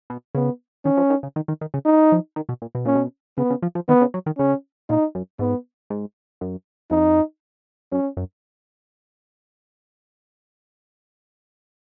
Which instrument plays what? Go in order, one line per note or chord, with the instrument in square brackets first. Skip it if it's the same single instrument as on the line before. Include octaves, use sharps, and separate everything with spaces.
[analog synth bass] B2
[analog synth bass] C#3 [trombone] B3
[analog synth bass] D#3 [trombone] C#4
[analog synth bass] F3
D#3
C#3
D#3
D#3
D#3
C#3
[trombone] D#4
[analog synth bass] F3
D#3
B2
A#2
B2
[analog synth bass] A#2 [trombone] C#4
[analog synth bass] B2
[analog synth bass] C#3 [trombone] B3
[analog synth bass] C#3
F3
F3
[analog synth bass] D#3 [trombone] B3
[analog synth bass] C#3
F#3
D#3
[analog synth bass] C#3 [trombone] C#4
[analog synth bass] A#2 [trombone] D#4
[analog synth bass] F#2
[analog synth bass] G#2 [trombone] B3
[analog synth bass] G#2
F#2
[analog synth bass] F2 [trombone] D#4
[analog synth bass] F#2 [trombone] C#4
[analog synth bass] F#2